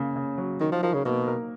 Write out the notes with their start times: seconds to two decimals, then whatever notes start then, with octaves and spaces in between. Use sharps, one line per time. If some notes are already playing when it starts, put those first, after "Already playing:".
Already playing: C#3 A#3
0.16 C#3
0.38 F#3
0.60 D#3 D#4
0.72 F3
0.83 F3 A#4
0.94 C#3
1.05 B2 A#3
1.28 A#4